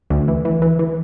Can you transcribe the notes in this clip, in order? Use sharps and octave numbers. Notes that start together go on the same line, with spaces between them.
D2
E3
E3
E3
E3